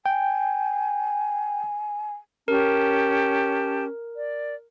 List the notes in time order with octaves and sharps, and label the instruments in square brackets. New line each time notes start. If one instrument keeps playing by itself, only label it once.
[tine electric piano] G5 [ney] G#5
[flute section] C#4 G4 A5 [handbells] A#4
[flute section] D5